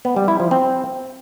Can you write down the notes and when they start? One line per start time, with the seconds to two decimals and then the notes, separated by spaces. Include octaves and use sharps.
0.05 B3
0.16 G3
0.28 E4
0.40 F3
0.51 C4